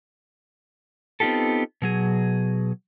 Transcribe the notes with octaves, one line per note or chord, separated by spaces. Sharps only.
B3 C4 D#4 F4 G4 A4
B2 F#3 G#4